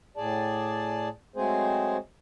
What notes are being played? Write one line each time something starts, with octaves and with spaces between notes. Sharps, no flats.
A2 G#4 D5 A5
F#3 G#3 A3 C4 G#4 C5